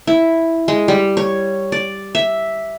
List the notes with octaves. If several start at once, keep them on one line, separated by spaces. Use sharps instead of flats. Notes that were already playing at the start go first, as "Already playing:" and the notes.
E4
G#3
G3
C#5
D5
E5